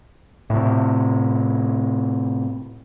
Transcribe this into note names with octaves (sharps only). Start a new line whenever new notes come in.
A2 C3